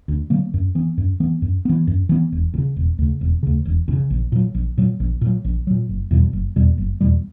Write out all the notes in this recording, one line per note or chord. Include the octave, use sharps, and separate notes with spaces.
D2
D3 F#3 A#3
F#2
E3 B3
F#2
E3 B3
F#2
E3 B3
F#2
E3 B3
E1
D2
C#3
E1
D2 C#3
E1
D2 C#3
E1
D2
C#3
A#1
A#2 F#3
A#1
A#2 F#3
A#1
A#2
F#3
A#1
A#2 F#3
F#1
E2 B2 G3
F#1
E2 B2 G3
F#1
E2 B2 G3